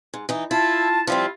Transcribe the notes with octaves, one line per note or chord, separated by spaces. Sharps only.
G#2
E3 D#4
E4 F4 A5
F3 G3 C4 E4 F4